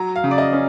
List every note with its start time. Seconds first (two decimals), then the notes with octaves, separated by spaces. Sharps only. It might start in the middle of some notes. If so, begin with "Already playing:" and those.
Already playing: F#3 A#5
0.16 F5
0.24 C#3
0.31 D5
0.38 D#5
0.53 C#4